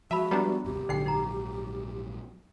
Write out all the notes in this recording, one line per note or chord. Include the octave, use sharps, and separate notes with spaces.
F3 G#3 F#4 E5 A5 B5
G3 B3 D4 A#5
G#1 D#2 C3 G4
A#1 G#2 D3 F#3 D#4 G5 C7
D#4 A#5